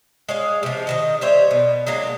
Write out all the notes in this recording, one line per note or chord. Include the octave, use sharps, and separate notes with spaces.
G#3 C#5 F5
C3 F3
D#3 F3 D#5
G3 C5 C#5 E5
B2
F#3 G#3 A#3 D4